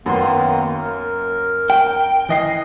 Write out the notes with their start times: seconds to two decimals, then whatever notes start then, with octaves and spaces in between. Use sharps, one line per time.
0.06 F#2 D#3 A#3 B3 C6
0.81 A#4
1.70 G5
2.29 E3 D#5 C7